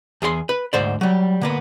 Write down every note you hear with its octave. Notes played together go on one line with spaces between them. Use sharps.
E2 G#4 A4 C6
B4
D2 G#2 C5 D5
F#3 G3
D3 A#3 B3